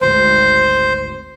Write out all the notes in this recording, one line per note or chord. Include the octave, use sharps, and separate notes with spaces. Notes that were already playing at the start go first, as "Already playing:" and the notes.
G#1 D2 C5